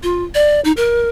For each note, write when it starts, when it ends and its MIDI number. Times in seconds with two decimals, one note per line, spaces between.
0.03 0.24 65
0.35 0.60 74
0.65 0.72 63
0.77 1.09 70